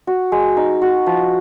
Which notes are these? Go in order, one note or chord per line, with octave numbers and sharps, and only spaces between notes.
F#4
G#3
D#4
F#4
F3